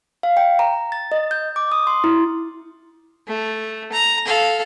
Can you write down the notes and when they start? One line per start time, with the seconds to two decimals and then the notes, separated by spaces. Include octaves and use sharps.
0.23 F5
0.37 G5
0.59 A#5
0.92 A6
1.12 D#5
1.31 G6
1.56 D6
1.72 D#6
1.87 C6
2.04 E4
3.27 A3
3.92 A#5
4.25 A4 F5